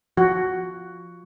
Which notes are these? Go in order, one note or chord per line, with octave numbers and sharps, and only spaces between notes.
F3 F#4